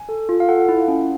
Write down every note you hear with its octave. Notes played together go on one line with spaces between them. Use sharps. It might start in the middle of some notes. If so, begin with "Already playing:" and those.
Already playing: G#5
A4
F4
F5
A4 F#5
E4
C#4